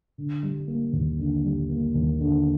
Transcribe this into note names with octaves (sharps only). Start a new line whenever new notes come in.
D3
G3
A#3
D#2
D3
G3
A#3
D#2
D3